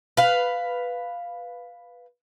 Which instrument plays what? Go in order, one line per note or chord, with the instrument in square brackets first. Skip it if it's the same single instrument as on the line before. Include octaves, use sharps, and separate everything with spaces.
[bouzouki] B4 F5